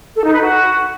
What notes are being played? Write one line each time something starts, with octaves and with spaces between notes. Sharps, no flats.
A4
D#4
B4
F#4